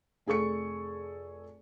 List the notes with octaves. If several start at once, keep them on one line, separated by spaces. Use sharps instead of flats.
F1 G#4 A4 C#6 C#7